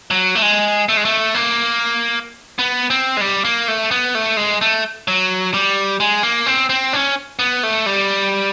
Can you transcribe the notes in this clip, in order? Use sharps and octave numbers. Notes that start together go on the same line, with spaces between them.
F#3
A3
G#3
A3
G#3
A3
A#3
B3
C4
G#3
G3
A#3
A3
B3
A3
G#3
A3
F#3
G3
G#3
A#3
C4
C4
C#4
B3
A3
G3